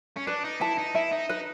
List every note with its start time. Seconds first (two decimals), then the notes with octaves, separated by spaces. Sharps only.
0.17 C#4
0.27 D4 B4
0.44 D#4
0.61 E4 A5
0.78 D#4
0.95 E4 E5
1.12 D#4
1.29 D#4 B4